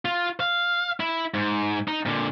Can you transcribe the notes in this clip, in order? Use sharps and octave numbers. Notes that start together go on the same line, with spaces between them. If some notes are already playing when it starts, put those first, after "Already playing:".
F4
F5
E4
G#2
D#4
A#2 D3